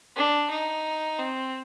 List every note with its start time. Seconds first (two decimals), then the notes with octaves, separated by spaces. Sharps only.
0.16 D4
0.50 D#4
1.19 C4